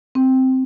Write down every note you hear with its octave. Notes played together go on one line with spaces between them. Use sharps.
C4